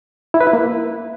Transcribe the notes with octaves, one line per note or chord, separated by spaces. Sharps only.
E4
B4
E4
A#3